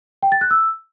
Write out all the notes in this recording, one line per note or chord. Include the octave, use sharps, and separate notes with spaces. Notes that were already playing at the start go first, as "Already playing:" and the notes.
G5
A6
F#6
E6